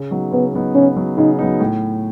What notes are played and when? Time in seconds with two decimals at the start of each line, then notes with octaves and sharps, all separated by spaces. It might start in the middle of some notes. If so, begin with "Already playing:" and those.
Already playing: C#3
0.11 F#3 B3 D#4
0.32 C#3 B3
0.53 F#3 B3 D#4
0.75 C#3 C#4
0.96 F#3 B3 D#4
1.17 C#3 D#4
1.39 F#3 B3 D#4
1.60 A2